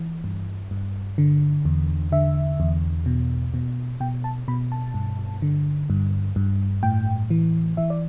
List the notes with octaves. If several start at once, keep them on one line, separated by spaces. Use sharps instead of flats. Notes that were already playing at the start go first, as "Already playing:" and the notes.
Already playing: E3
G2
G2
D3
E2
D3 E5
E2
B2
B2
B2 G5
A5
B2 B5
A5
G2
D3
G2
G2
A2 G5
E3
E3 E5
D5